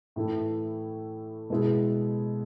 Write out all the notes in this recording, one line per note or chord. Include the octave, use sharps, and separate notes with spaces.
A2 E3 A3 E4
B2 G#3 B3 E4 G#4